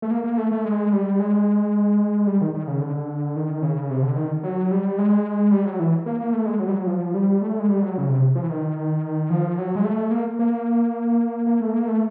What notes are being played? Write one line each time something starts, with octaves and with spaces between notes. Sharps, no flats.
A3
A#3
A#3
A3
A3
G#3
G3
G#3
G3
D#3
D#3
C#3
D3
D#3
C#3
C3
D3
D#3
F#3
G3
G#3
G3
F#3
E3
A#3
A#3
A3
G#3
F#3
G3
F#3
F3
G3
A3
G#3
G3
F#3
C#3
C3
F3
E3
D#3
F3
F#3
G#3
A3
A#3
A#3
A#3
A3
A#3
A3